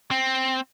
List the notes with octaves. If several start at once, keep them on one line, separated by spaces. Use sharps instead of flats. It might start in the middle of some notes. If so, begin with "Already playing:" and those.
C4